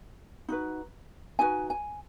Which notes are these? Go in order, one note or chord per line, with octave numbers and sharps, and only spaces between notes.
D#4 F#4 B4
D#4 F#4 B4 G#5
G#5